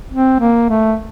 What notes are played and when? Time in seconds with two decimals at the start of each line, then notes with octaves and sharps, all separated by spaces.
0.12 C4
0.40 A#3
0.69 A3